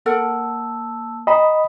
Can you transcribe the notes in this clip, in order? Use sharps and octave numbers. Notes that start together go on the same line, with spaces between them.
A#3 A4 A#4 F#5 A5 E6
D#5 G5 A#5 B5